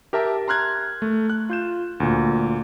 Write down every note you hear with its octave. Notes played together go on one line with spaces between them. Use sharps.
G4 A#4 E5 A5 D6
A#5 C6 F6 F#6 G#6
A3
F#6
F4 G6 E7
D2 A#2